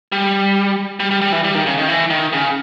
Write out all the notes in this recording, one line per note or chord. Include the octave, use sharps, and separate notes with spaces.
G3
G3
G3
G3
E3
G3
D#3
C#3
D#3
E3
D#3
C#3